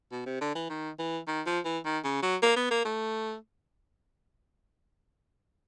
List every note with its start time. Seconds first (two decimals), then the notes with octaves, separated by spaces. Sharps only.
0.11 B2
0.26 C3
0.41 D3
0.55 E3
0.70 D#3
0.99 E3
1.28 D#3
1.46 F3
1.65 E3
1.85 D#3
2.04 C#3
2.23 F#3
2.42 A#3
2.56 B3
2.71 A#3
2.85 A3